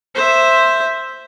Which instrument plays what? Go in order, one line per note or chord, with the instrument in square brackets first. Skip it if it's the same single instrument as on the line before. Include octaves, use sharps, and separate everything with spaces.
[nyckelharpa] C5 E5